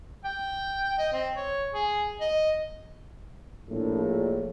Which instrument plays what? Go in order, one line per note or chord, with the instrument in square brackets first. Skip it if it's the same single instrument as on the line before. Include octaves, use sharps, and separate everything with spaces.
[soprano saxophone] G5
D#5
C4
C#5
G#4
D#5
[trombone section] A#1 A2